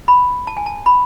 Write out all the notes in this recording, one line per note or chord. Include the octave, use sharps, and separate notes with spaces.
B5
A5
G#5
A5
B5